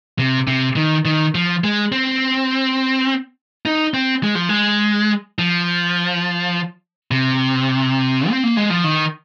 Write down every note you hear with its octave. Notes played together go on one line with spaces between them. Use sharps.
C3
C3
D#3
D#3
F3
G#3
C4
D#4
C4
G#3
F3
G#3
F3
C3
C4
A#3
G#3
F3
D#3